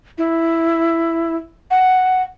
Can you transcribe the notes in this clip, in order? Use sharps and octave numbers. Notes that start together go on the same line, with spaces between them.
E4
F#5